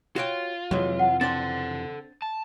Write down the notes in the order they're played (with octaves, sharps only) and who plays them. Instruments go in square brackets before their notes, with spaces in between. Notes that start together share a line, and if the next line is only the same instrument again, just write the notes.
[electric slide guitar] F4 [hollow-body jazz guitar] F#4 C#5 G5
[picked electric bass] F2 C3 E3 [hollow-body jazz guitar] F#3 G#3
[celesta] F#5
[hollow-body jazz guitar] C4 D4 C5 [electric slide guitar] A4 F#5 [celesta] A6
[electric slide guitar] A5